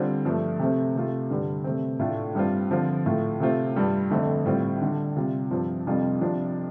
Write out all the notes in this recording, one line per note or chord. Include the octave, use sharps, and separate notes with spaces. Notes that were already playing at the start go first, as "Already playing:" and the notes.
Already playing: D3 G3 C4 F4
G2 F3 A3
C3 A3 C4
C3 A3 F4
G2 D3 G3
C3 A3 C4
A2 A3 D4 F4
G2 G3 C4 F4
D3 F3 C4 F4
A2 A3 F4
C3 A3 C4 F4
G2 G3 F4
F2 D3 A3 C4
A2 G3 C4 F4
D3 G3 D4
C3 G3 F4
G2 F3 C4 F4
F2 C3 G3 D4 F4
C3 F3 D4 F4